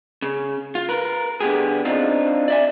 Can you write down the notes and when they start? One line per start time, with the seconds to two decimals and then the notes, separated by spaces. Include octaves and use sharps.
0.22 C#3
0.75 F4
0.89 A#4 B4
1.40 D3 B3 G4 G#4
1.85 C4 D4 D#4 F4
2.48 D5 E5 G#5